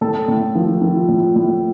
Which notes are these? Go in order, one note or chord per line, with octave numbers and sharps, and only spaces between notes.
A2 A4
A2
F3
F3
A2
A2